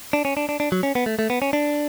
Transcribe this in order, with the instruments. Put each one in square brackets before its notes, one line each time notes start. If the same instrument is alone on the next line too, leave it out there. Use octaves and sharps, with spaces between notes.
[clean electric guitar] D4
C#4
D4
D4
D4
F#3
C#4
B3
A3
A3
B3
C#4
D4